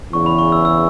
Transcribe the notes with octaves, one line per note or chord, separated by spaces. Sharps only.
E2 C#3 E3 C#6
B5
C#6
E6
E6